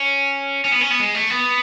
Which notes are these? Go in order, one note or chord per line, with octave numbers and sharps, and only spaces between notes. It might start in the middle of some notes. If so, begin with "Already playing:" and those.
Already playing: C#4
C#4
B3
C#4
B3
G#3
A3
B3